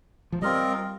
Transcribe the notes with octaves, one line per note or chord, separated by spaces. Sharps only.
F3
G3 C4 F4 A#4 D#5